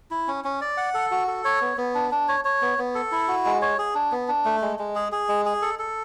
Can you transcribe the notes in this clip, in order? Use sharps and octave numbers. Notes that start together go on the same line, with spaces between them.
E4
C#4
C#4
D5
F#5
A4
F#4
A4
C#5
B3
B3
D4
D4
C#5
C#5
B3
B3
A4
E4
F#4
G#3
C#5
G#4
D4
B3
D4
A3
G#3
G#3
G#4
G#4
G#3
G#4
A4
A4